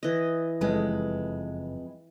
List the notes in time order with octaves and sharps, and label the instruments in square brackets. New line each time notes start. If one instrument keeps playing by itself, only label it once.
[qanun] E3 D#5
[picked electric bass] F#1 [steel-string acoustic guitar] F2 G#3 B4